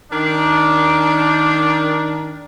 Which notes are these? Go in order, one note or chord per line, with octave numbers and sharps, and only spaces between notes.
D#3 D4